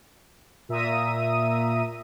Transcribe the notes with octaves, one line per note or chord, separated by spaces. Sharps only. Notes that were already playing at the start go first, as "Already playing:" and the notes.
A#2 E5 A#5 D#6 D#7